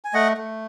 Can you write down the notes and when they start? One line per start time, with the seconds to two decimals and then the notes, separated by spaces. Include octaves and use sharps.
0.04 G#5
0.13 A3 D#5 F#5
0.37 A3